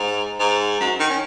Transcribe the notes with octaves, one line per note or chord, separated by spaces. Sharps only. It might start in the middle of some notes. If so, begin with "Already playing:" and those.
Already playing: G#2
G#2
F#2
D#3
C#4